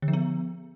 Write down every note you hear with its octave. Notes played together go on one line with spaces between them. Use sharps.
D3
F3
B3